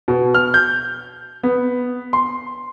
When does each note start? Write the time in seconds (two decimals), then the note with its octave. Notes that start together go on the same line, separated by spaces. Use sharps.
0.08 B2
0.34 F6
0.54 G6
1.43 B3
2.13 C6